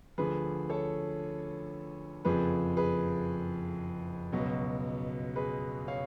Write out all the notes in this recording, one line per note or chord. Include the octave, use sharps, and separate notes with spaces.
D2 D3 F3 G#4 B4
A4 C#5
F#1 F2 F3 G#4 B4
G#4 B4
C#2 B2 F#3
G#4 B4
C#5 F5